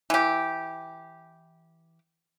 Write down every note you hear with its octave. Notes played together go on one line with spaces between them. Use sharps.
E3 G4